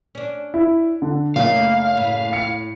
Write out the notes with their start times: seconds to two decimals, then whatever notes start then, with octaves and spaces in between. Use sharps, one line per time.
0.15 C#4 D4
0.54 E4
1.02 D3
1.36 F#1 A3 A#3 D#4 F5
1.97 A2
2.33 C#7